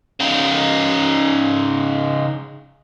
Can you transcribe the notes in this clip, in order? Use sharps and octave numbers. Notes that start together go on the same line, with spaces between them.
C#3 D#4